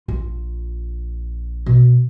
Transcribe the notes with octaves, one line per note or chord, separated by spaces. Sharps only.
A#1 F4
B2